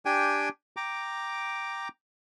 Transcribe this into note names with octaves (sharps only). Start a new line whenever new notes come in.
D4 G4 G5 G#5
G5 A#5 D6